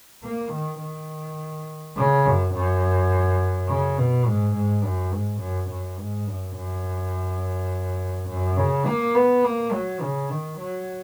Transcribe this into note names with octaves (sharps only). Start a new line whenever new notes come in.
A#3
D#3
D#3
C#3
F#2
F#2
C#3
B2
G#2
G#2
F#2
G#2
F#2
F#2
G#2
F#2
F#2
F#2
C#3
A#3
B3
A#3
F#3
C#3
D#3
F#3